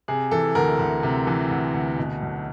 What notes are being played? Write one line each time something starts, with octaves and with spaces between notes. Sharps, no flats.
C3 G#4
E3 A4
D2 A#4
D2
C3
E3
D2
D2
B2
B1